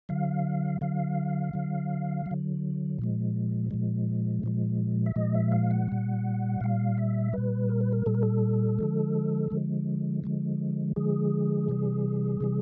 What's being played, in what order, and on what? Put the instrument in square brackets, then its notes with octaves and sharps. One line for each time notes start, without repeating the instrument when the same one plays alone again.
[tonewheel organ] D3 F#3 F5
D3 F#3 F5
D3 F#3
F#3
D3
A#2 F3 G#3
A#2 F3 G#3
A#2 F3 G#3
E5
A#2 F3 G#3 D#5
E5
F5
F#5
A#2 G3
A#2 G3 F5
E5
A#2 G3 B4
A#4
B4
A#4
A#2 G3 A4
A#4
A4
D3 F3 G#3
D3 F3 G#3
D3 F3 G#3
D3 F3 G#3 G#4
C3 E3 G3
C3 E3 G3